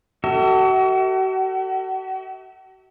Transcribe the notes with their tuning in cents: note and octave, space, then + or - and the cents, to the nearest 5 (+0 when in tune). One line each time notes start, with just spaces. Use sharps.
F#4 +40 A4 +25 E5 -25